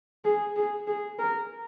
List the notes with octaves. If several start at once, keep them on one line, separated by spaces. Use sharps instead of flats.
G#4
G#4
G#4
A#4